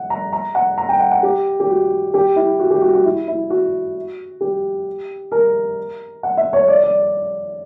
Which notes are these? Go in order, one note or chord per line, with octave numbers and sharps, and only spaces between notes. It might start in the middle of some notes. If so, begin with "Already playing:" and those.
Already playing: F#5
A#5
A#5
F#5
A#5
G5
F#5
F#5
G4
G4
F#4
G4
E4
F#4
G4
F#4
F#4
E4
E4
F#4
G4
A#4
F#5
E5
C#5
D5
D5